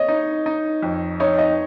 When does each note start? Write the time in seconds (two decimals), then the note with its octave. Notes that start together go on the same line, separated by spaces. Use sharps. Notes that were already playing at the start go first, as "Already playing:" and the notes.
Already playing: C#5 D#5
0.08 D#4
0.46 D#4
0.82 F2
1.20 D#4 C#5
1.38 D#5